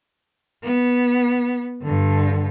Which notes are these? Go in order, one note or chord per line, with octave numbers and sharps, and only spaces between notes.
B3
G2 D3